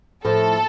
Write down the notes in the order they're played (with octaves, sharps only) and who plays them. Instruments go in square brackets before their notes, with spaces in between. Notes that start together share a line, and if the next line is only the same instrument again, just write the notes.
[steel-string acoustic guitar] A2 F3 A3 [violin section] A4